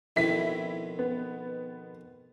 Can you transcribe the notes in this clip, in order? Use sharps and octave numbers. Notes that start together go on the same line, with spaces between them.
F2 B2 D#3 E4 B6
B3